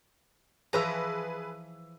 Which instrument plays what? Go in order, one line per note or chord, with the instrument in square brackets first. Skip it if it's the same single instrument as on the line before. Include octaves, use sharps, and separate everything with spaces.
[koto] E3 F3 A#5 [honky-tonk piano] G#4 B4 E6